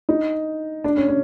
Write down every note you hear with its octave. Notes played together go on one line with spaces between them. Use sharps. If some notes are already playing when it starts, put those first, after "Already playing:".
D#4
D4
C#4
C#4